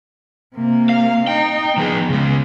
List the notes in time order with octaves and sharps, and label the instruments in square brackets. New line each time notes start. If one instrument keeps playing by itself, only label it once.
[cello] C3 A#3
[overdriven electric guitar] F5
[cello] D#4 [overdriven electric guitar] G5
[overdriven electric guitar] F3 G#4 [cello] B3
[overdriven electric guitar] C#3 G#3